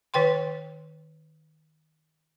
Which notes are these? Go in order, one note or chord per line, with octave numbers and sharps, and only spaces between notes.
D#3 B4 G5 C6